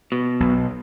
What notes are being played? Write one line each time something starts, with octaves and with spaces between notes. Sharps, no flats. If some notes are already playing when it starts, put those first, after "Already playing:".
B2
B1